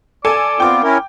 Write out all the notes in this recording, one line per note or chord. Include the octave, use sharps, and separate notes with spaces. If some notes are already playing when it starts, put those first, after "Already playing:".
A4 D5 G#5
B3 C4 F4 G5 D6
C#4 E4 A#4